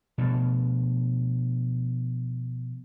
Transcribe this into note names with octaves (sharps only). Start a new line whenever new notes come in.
B2 F3 A3